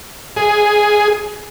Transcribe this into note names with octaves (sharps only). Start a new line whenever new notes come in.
G#4